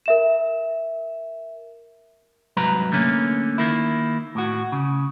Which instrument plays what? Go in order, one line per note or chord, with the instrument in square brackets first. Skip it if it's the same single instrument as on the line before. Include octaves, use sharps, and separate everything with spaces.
[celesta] A#4 E5 E7
[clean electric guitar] C2 G#2 F#3 B4 A#5
D3 A3 A#3 C#4
D#3 A#3 E4
A2 F#4
C#3